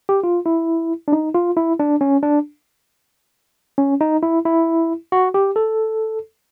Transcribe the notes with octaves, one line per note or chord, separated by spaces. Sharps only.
G4
F4
E4
D4
D#4
F4
E4
D4
C#4
D4
C#4
D#4
E4
E4
F#4
G4
A4